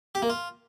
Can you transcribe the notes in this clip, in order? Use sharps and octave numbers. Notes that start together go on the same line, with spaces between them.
G4
A#3
F4